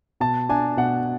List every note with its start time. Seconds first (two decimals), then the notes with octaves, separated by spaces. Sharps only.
0.20 B2 A5
0.49 D4 G#5
0.77 B2 F#5